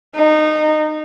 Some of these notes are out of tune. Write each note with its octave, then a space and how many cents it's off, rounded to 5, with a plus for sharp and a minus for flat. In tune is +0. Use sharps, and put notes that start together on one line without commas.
D#4 -20